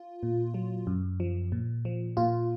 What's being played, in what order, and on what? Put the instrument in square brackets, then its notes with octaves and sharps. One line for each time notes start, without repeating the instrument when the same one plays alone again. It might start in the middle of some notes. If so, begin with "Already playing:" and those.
Already playing: [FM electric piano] F4
A#2
F#3
F#2
F3
A#2
F3
A#2 F4